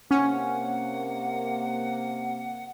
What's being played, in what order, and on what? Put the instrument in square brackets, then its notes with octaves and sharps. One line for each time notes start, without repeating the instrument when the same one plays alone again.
[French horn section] C3 A#3 [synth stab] C#4 [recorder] F#5